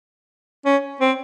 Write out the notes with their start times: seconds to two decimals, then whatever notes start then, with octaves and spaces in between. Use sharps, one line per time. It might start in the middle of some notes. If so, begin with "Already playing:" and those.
0.66 C#4
1.01 C4